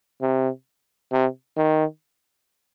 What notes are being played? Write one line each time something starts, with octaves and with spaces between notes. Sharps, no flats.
C3
C3
D#3